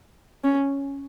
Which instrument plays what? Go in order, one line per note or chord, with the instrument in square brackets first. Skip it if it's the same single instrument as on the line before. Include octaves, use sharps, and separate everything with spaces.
[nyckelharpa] C#4